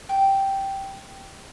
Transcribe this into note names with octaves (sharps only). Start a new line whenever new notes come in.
G5